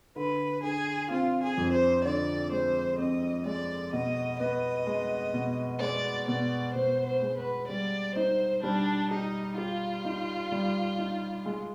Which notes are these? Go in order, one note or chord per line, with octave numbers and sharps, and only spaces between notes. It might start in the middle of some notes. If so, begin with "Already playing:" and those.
D3 B4
D3 G#4
C4 F4
G#4
F2
C5
D3 D5
G#3 C5
C4 D#5
G#3 D5
B2 D#5
B3 D#5
G#3
B2
G#3 D5
B2 D5
B2 C5
C5
G#3
B4
G3 D5
D#4 C5
G3 D4
D#4 G4
F4 G4
D#4
G3
D#4
G#3